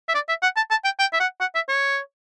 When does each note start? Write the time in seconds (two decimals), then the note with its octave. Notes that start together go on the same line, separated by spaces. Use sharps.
0.09 E5
0.14 D5
0.28 E5
0.43 F#5
0.56 A5
0.70 A5
0.84 G5
0.99 G5
1.13 E5
1.20 F#5
1.40 F#5
1.55 E5
1.68 C#5